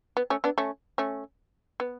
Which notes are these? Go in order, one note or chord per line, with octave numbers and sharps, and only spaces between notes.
B3
A3 C#4
B3 D4
A3 C#4
A3 C#4
B3